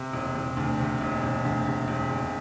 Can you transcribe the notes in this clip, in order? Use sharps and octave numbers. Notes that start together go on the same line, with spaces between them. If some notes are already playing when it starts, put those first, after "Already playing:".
Already playing: C3
E1
E1
D2
C3
E1
E1
D2
C3
E1
E1